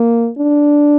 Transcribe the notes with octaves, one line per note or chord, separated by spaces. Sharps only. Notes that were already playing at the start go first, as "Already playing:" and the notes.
Already playing: A#3
D4